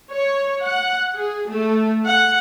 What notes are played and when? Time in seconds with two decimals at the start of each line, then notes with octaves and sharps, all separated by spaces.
0.12 C#5
0.62 F#5
1.15 G#4
1.49 A3
2.05 F#5